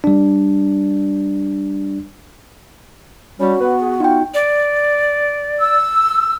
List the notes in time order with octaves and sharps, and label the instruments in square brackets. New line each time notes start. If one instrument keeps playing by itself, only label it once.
[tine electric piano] G3 D4
[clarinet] G3 [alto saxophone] C#4 [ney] F#4
[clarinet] B3 [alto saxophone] B4
[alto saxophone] G#4
[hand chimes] D#4 G5 [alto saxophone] F4
[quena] D5
[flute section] E6